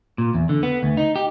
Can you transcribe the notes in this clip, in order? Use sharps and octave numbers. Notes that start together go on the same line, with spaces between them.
A#2
E2
D3
B3
D2
D#4
G4